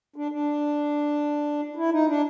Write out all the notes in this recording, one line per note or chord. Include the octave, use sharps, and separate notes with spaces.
D4
D4
E4
D#4
D4